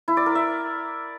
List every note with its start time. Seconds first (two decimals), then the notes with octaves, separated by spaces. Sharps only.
0.08 E4
0.17 D5
0.26 A#4
0.35 E5